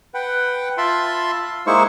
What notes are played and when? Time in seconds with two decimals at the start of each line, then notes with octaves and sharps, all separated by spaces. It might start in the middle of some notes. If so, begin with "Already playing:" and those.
0.14 B4 F#5 G5
0.78 F4 E5 A5 B5 C6
1.67 G#3 A#3 D#4 E4 C5 C#6